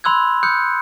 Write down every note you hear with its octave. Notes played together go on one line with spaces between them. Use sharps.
B5 C6 E6 F#6 G#6
D#6 F#6 G6 C#7